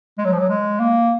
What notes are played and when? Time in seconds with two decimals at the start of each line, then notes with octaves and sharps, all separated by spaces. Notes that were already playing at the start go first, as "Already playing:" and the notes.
0.18 G#3
0.25 F#3
0.32 F3
0.39 F#3
0.49 G#3
0.80 A#3